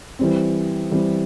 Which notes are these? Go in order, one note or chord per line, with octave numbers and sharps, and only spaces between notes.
E3 G3 C4
E3 G3 C4